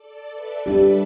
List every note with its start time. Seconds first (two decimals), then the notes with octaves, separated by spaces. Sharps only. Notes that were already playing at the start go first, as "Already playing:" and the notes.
Already playing: A4 D5
0.30 B4 E5
0.66 G3 D4 G4 A4 D5